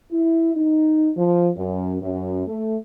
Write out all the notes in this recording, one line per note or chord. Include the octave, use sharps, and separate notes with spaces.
E4
D#4
F3
F#2
F#2
A3